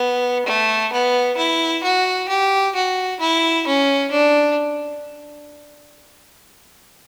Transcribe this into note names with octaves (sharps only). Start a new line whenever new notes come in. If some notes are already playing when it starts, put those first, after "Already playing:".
Already playing: B3
A3
B3
E4
F#4
G4
F#4
E4
C#4
D4